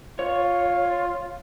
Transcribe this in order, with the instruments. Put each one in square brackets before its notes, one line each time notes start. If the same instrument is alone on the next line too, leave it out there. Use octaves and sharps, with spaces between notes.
[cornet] F4 [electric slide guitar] C#5